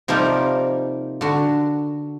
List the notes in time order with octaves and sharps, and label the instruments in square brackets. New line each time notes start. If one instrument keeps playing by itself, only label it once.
[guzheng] C3 F3 G3 A#3 D#4 A#4
D3 F#4